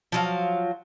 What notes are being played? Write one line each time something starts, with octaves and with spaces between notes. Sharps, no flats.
F3 F#3 F5